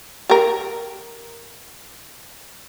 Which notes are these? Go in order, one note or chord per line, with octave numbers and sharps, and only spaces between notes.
G4 A#4